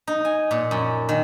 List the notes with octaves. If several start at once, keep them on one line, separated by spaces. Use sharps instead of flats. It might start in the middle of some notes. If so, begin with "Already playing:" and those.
D#4
G#5
A#2
F#2
D#3